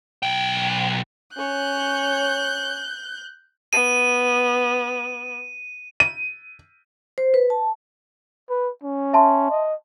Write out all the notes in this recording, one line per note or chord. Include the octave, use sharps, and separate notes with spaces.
B1 G5
C#4 C#5 F#6 G6
B3 D#7
D#7
C5
B4
A5
B4
C#4
E5 A5 C6
D#5